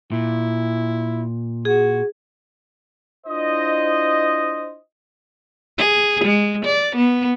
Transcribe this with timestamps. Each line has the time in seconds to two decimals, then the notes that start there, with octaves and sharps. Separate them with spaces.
0.12 A#2 E4
1.65 F#4 G#4
3.27 D4 E4 F4 C5 D#5
5.78 G#4
6.24 G#3
6.65 D5
6.96 B3